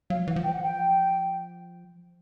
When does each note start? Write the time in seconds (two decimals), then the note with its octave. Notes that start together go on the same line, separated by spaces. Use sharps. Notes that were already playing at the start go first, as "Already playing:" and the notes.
0.10 F#3 F5
0.19 F3
0.27 E3 F#5
0.36 F3
0.44 G5
0.53 F#5
0.61 G5